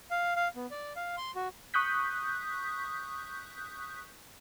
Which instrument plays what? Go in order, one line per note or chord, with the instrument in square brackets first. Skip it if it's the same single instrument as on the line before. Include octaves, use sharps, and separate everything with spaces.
[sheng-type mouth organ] F5
F5
B3
D5
F5
C6
F#4
[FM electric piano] C#6 D#6 F#6 G6 B6